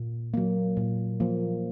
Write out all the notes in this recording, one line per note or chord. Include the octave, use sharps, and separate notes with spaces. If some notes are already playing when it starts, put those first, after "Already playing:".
Already playing: A#2
F#3 A#3
A#2
F3 A#3